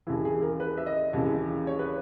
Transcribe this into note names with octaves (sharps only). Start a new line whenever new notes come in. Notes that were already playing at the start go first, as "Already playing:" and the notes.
D#2 C#3 E3 E4
G#4
A#4
B4
E5
D#5
D#2 C#3 E3
C#5
B4